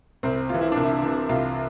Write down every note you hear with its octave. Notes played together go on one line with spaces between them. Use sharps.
C2 C4
C3 E3 F4
E4
C2 D4
E4
C3 E3
C2 F4